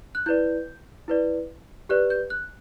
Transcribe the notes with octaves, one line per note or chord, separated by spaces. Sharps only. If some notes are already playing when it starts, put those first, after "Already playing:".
F#6
E4 B4 D5 G6
E4 B4 D5
G4 B4 D5 F#6
G6
F#6